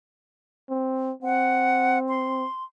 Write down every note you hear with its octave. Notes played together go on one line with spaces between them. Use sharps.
C4
C4 F#5
C6